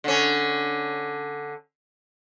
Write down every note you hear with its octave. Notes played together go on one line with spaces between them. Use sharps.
D3 C#4